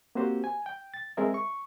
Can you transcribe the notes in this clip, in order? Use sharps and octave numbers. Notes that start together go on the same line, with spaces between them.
A#3 C4 F#4 G4 C5
G#5
G5
A6
G#3 C4 G#4 A#4 E5
C#6